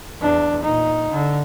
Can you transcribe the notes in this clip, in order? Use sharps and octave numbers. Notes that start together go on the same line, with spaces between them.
E2 D4
A#2 D#4
D3